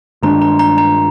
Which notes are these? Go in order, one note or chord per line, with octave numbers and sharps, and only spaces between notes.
G2 D#3 G#3 D4 A#5
A#5
A#5
A#5